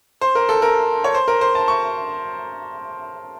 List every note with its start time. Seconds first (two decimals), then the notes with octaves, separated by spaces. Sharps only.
0.21 C5
0.35 A#4
0.49 A4
0.62 A#4
1.04 C#5
1.14 C5
1.28 A#4
1.41 C5
1.55 A5
1.68 C#6